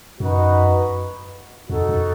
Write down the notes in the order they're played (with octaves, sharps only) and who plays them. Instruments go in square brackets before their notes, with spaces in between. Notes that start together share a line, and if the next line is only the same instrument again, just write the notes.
[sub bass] F#2 [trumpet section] D#4 F#4 B4
[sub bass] F2 [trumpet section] D#4 F#4 A4
[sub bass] F#2